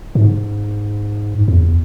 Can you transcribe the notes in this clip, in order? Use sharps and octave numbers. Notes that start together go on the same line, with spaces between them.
G#2
E2